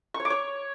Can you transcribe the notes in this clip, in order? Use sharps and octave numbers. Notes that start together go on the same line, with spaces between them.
C#6
C#5
D6
C#5